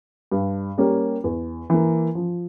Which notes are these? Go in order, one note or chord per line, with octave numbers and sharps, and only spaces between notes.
G2
G3 A#3 C#4
E2
E3 A#3
F3